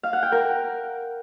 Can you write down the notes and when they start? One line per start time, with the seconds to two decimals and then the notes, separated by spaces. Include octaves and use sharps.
0.03 F5
0.13 F#5
0.23 G5
0.32 A#4